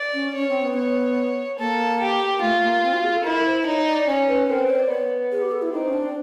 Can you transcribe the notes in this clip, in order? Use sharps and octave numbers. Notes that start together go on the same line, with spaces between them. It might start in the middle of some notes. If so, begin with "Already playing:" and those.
Already playing: D5
C#4
C#4 C#5
C4
B3
C#5
A#3 A4
G4
A3 F4
A#3
C4
F#4
G#4
A4
E4 A#4
C5
D#4 C#5
D5
C#4 C#5
B4
C4 A#4
B4
C#5
D5
B3 C#5
G#4
G4
A4
E4
C4 D#4
C#4
D4